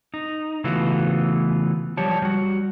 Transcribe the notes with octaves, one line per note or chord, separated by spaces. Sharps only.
D#4
C#3 E3 A3 B3 F4 F#4
F3 G3 G4 C#5 A5
G3 F#4